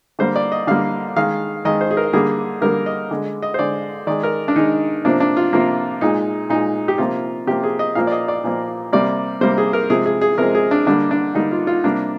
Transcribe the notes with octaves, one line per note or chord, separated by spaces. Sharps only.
D3 G3 A#3 C5
D5
D#5
D3 G3 A#3 F5
D#3 G#3 F5
D#3 G#3 D#5
C5
G#4
A#4
D3 G3 A#3 G#4
D3 G3 A#3 A#4
D#5
D3 G#3
D#5
C5
D3 G#3 D5
D#3 G#3 D5
A#4
D4
D#3 G#3 D#4
C3 F3 A#3 D4
D4
F4
C3 F3 A#3
A#2 G#3 D#4
A#2 G#3 D#4
G4
C3 F3 A#3 F4
C3 F3 A#3 G4
G#4
D#5
A#2 F3 A#3 F5
D5
D#5
D5
A#2 F3 A#3
C3 G3 A#3 D5
C3 G3 A#3 C5
G#4
A#4
C3 F3 G#3 G#4
G#4
G#4
C3 F3 G#3 A#4
G#4
D4
D3 G3 A#3 D4
D4
D3 G3 A#3 D#4
F4
F4
C3 G3 A#3 D4